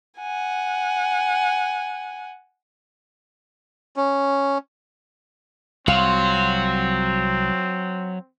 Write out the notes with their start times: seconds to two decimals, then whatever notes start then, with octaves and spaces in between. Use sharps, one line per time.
0.19 F#5 G#5
3.96 C#4
5.88 C2 F#3 C4 F4 C#6